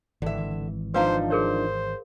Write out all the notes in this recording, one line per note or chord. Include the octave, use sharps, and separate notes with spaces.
G#1 D3 E3 E5
F3 D4 D#4 B4 C5 F5 A#5
G#4 A#4 C5 C#5